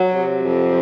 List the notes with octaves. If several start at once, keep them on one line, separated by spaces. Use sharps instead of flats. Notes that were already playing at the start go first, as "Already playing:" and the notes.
Already playing: F#3
C3
F2